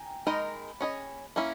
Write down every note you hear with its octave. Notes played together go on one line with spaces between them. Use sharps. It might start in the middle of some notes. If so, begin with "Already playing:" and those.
Already playing: G5 G#5 A#5
G#3 D#4 A#4 D#5 B5
C#4 G#4 D#5 B5
A#3 C#4 E4 A#5